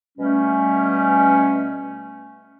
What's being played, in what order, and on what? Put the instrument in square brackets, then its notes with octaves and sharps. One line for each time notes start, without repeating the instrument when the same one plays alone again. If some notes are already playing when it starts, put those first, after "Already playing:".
[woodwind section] B2 G3 A3 C#4